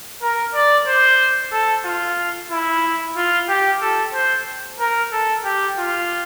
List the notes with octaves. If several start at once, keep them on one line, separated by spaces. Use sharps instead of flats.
A#4
D5
C5
A4
F4
E4
F4
G4
A4
C5
A#4
A4
G4
F4